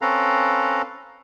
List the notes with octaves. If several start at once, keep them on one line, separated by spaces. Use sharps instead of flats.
C4 C#4 A4 B4 F5 A#5